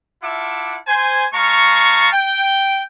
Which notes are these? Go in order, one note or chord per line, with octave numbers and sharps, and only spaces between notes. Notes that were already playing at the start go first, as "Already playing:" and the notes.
E4 F4 E5 F#5 A5 D6
C5 G#5
G#3 F5 A5 A#5 C#6
G5